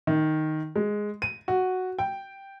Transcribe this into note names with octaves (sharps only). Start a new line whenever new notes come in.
D#3
G#3
D#7
F#4
G5